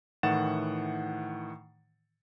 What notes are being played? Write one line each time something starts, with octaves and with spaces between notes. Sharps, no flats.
A2 D#3 E3 F#5 A6 E7